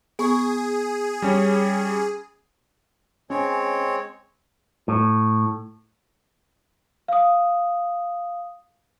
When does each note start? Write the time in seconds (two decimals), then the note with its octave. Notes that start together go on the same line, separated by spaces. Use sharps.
0.19 B3 G#4 C#6
1.22 G3 C#4
3.30 G#3 C4 C#4 C#5
4.88 A2
7.08 F5 D#6